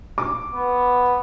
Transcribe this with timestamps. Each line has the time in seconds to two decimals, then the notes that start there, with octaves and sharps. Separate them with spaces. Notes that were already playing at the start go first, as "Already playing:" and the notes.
0.18 D6
0.54 B3